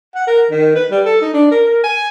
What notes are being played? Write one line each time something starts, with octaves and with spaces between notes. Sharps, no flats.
F#5
A#4
D#3
B4
G3
A4
D#4
D4
A#4
A#4
G#5